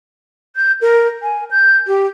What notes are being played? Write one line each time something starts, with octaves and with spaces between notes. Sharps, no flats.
G6
A#4
G#5
G6
G4